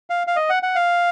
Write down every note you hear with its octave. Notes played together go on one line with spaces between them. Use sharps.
F5
F5
D#5
F#5
F#5
F5